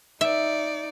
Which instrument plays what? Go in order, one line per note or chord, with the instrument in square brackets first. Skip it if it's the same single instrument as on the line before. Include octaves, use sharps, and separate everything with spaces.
[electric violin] D#4 D5 [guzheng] E5